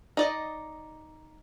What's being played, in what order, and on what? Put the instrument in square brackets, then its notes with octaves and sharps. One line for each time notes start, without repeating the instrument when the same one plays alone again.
[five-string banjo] D#4 D5 D#5